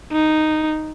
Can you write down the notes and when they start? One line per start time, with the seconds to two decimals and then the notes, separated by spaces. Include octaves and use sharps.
0.12 D#4